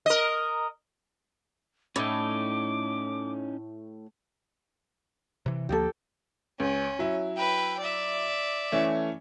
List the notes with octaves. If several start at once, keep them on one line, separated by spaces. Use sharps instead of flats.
A#4 D#5
A2 C#4 D#4 D6
C3 E3
D2 F3 A#3 G4 A4
C#2 C#4
F#3 E4
B4 G5
D5 E5
E3 A3 C#4